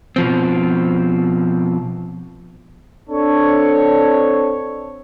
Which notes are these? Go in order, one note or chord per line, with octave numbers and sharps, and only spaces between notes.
B2 F3 C4
C4 D4 A4 C#5